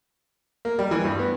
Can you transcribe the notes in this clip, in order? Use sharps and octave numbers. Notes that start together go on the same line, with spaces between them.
A#3
G3
E3
G2
B3